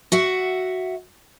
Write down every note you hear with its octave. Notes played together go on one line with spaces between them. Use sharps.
F#4 E5 F#5